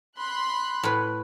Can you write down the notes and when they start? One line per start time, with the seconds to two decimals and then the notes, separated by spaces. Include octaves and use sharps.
0.18 B5 C6 F#6
0.83 A2 B4